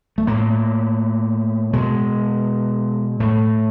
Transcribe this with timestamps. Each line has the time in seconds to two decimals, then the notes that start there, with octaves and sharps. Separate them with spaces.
0.18 A3
0.27 A2 A#3
1.73 B2 G#3
3.20 A2 A3